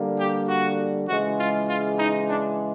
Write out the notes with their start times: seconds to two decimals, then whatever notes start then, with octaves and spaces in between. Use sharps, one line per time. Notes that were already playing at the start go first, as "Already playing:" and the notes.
Already playing: D3 G3 A#3
0.18 G4
0.48 F#4
1.08 C#3 E3 G#3 F#4
1.38 F4
1.68 F4
1.98 D#4
2.27 D4